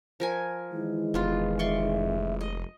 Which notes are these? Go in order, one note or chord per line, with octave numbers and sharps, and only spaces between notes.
F3 A#4 G#5
D#3 E3 G#3 E4
F1 B3 F4 F5
D5 E5 C6 C#6
D#5